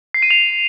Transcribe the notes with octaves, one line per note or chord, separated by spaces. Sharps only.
C7
D#7
F7